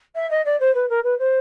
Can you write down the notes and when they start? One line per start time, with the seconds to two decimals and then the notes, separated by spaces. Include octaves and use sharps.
0.15 E5
0.30 D#5
0.45 D5
0.60 C5
0.74 B4
0.89 A#4
1.03 B4
1.18 C5